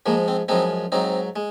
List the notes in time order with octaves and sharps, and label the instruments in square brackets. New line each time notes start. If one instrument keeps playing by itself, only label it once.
[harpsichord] G#2 F3 G#3 A#3
C4
F#2 F3 G#3 C4 D#4
G#2 F#3 C4 D#4
G#3